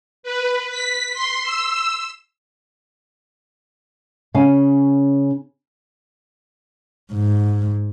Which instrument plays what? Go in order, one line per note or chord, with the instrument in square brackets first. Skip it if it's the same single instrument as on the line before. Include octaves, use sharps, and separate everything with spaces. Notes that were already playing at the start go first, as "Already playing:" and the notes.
[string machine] B4
B6
C6
E6
[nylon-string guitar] C#3 C#4 F5 G#5
[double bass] G#2